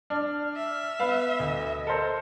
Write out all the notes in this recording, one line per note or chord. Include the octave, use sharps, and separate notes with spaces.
D4 F6
E5
B3 B4 F5
D2 D#5
A4 A#4 C5